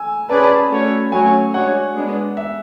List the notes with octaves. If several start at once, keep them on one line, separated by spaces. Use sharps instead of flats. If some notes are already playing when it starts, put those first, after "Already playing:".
Already playing: G#5 E6
C#4 G#4 B4 D5 A5
B5
A5
A3 C#4 F#4 C#5
F#3 A3 C#4 F#4 C#5 G#5
G#3 D4 F#4 C#5 F#5
G#3 B3 D4
E5